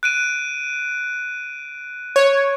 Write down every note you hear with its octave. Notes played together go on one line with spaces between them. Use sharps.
F#6 D7 D#7
C#5